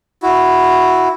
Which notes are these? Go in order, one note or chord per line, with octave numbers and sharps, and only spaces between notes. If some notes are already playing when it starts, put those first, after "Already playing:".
E4 F#4